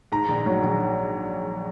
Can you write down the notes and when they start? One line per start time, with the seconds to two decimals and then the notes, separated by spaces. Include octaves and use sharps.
0.12 G#2 A#5
0.29 A#1
0.46 F#3
0.63 A#1